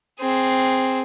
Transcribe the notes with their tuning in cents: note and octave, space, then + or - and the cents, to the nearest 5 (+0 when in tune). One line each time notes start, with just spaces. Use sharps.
C4 +0 G#4 +0